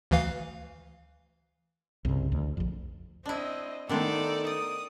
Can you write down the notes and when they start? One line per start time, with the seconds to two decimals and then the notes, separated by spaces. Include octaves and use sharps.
0.11 D2 E3 F5
2.05 C2 G2 C#3
2.32 D2
2.57 A#1 F2
3.26 C4 D4 E4 D#5
3.89 D#3 A3 B3 D4 D#4 A4 C5 D5
4.47 D5 D#6